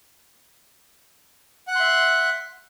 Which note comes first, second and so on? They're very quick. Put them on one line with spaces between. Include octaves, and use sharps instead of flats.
F#5 F#6 C6 E5